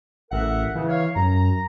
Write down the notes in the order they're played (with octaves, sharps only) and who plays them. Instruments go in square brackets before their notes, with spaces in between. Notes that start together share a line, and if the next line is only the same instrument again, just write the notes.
[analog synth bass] A1 [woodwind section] A#4 E5 F#5
[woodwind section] C#3 [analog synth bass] E3
[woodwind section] C#5 F5
[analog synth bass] F#2 [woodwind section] A#5